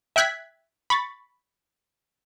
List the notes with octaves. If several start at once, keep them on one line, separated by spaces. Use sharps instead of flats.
E5 G5 F#6 G#6 B6
B5 C#6 A6